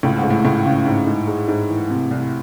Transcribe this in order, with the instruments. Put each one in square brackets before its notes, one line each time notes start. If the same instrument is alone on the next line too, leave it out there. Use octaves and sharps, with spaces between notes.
[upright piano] C#2 [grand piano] A2
[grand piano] G#2
[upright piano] C#2
[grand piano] A2
[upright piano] C#2 [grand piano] A2
[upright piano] C#3
G#2
G#2
G#3
G#2
E3
C3
C2